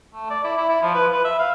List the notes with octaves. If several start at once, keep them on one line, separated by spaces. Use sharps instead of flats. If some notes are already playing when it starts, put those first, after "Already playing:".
A3
D5
E4
E4
E4
F3
B4
B4
E5
F5